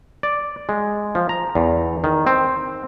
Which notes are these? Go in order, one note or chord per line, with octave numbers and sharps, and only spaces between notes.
D5
G#3
F3
A#5
E2
D#3
C4